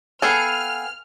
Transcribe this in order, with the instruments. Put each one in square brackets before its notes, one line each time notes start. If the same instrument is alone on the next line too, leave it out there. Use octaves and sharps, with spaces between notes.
[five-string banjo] B3 G#4 A4 [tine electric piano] F5 G5 G#5 [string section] F6